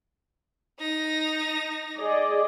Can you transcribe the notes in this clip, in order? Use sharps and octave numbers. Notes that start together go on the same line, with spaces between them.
D#4 A#6
G#4 D5 D#5